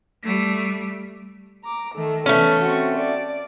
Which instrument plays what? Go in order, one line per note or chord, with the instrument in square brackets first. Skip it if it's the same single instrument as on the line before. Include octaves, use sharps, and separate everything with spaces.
[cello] G3 A3
[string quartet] A#5 D6
D#3 A3 A4
[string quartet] E3 B3 [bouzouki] A3 C#4
[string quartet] C4 F#4
D5